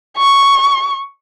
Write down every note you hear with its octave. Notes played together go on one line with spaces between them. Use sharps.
C#6